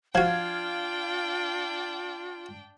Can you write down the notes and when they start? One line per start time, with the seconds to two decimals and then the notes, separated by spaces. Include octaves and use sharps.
0.15 F3 D4 F4 F#4 F5 G5 G#6